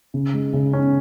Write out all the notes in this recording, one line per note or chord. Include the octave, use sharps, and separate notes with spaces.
C#3
G#3
C#3
C#4